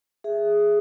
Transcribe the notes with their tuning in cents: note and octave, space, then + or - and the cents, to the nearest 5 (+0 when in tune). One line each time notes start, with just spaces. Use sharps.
G#4 +0 E5 +5